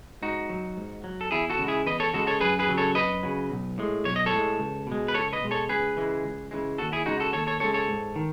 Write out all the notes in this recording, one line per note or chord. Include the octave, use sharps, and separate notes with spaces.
G#2 D#4 F#4
F#3
G#2
F#3
A4
E2 E4 G#4
F#4 A4
C#3 G#3
E4 G#4
E2 B4 D#5
A4 C#5
C#3 G#3 F#4 A4
A4 C#5
F#2 G#4 B4
G#4 B4
C#3 F#3
A4 C#5
F#2 B4 D#5
C#3 F#3
B1
A2 G#3
B1 C#5
D#5
A4 C#5
A2 G#3
C#2
B2 G#3
B4
C#2 A4 C#5
B4 D#5
B2 G#3
A4 C#5
C#2 G#4 B4
C#3 E3 G#3
C#2
C#3 E3 G#3
D#2 F#4 A4
E4 G#4
C#3 G#3 D#4 F#4
F#4 A4
D#2 A4 C#5
A4 C#5
C#3 G#3 A4 C#5
A4 C#5
G#2
D#3